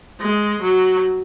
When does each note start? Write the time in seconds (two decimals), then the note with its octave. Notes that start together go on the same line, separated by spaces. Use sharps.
0.21 G#3
0.62 F#3